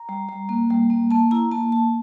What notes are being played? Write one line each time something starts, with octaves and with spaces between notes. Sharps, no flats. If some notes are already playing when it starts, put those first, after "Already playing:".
Already playing: A#5
G3
G3
A#3
G3
A#3
A#3 A5
E4 A#5
A#3 A5
A#3 A5